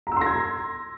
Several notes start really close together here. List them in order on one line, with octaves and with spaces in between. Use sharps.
A#5 E6 C6 A#6 G#6